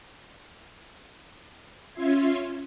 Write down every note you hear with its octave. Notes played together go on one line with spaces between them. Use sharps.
C#4 F4 E5 C6 G#6